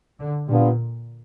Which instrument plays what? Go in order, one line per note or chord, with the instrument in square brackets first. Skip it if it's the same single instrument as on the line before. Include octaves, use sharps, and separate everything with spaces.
[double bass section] D3
[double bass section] A#2 [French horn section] G3 B3 D4 F4